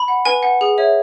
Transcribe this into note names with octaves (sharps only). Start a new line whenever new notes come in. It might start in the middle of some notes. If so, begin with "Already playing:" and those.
Already playing: B5
F#5
B4 G#5
F#5
G#4
C#5 E5